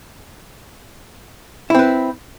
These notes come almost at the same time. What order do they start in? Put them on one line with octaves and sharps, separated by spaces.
E4 C4 B4